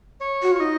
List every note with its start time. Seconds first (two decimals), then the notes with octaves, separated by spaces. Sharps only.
0.21 C#5
0.42 F#4
0.51 F4 C#5
0.60 D#4 D#5